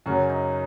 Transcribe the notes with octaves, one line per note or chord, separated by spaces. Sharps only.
F#2 C#3 F#3 C#4
D#4